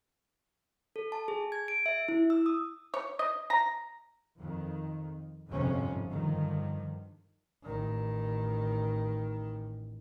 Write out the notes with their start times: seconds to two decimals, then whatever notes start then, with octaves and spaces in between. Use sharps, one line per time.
0.96 A4
1.12 A5
1.28 G#4
1.52 G#6
1.68 D7
1.86 E5
2.08 E4
2.30 E6
2.46 D#6
2.94 C#5
3.19 D#5
3.50 A#5
4.36 F2 D#3
5.48 G1 F2 G#2 C3 F3 C#4
6.10 G2 D3 D#3 F3
7.63 A1 D#3